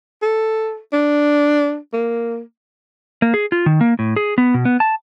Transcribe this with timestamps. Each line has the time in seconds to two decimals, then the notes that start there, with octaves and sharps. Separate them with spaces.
0.22 A4
0.93 D4
1.93 A#3
3.22 A#3
3.34 G#4
3.52 F4
3.66 D#3
3.81 A#3
3.99 A2
4.16 G#4
4.38 B3
4.54 B2
4.65 B3
4.80 A5